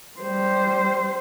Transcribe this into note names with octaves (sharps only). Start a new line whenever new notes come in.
G3 C5